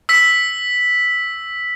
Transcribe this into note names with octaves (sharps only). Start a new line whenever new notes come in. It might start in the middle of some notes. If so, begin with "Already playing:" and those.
E6 B6